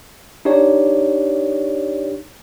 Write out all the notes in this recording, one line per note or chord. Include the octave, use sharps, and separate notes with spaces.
D4 D#4 G4 C#5 D5